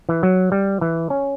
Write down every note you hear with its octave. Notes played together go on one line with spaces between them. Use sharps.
E3
F#3
G3
E3
C#4